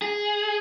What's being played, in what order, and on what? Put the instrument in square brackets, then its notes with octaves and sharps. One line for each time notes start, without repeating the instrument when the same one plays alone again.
[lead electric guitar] G#4